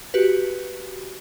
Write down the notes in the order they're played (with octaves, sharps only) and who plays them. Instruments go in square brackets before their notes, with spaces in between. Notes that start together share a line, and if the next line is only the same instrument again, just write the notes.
[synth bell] F#4 G4 B4